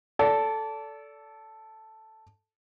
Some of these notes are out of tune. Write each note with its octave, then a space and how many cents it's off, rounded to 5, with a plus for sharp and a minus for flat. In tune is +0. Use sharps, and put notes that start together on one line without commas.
A4 +0 D5 -30